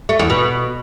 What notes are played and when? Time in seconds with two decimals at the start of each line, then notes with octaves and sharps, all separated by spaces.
0.09 A3
0.19 E2
0.30 B2